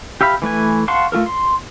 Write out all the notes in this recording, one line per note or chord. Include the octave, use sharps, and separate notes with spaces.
G4 E5 F5 B5
E3 A3 B4 G#5
F5 F#5 A5 C6 C#6
A3 F4 A4 A#4
C6